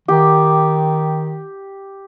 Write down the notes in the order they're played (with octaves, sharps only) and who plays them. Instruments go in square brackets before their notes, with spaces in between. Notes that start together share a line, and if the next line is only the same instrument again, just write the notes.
[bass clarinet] D#3 [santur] G4